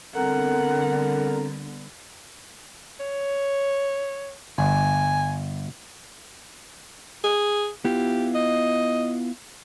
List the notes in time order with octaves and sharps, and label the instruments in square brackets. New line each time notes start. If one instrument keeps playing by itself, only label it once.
[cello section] D3 G3 B3 [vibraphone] C4 A4 [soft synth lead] A#4 [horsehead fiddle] F#5
[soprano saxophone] C#5
[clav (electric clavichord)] G1 [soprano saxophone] G#5
[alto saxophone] G#4
[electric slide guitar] B3 E4 F4 [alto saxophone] G4
[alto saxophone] D#5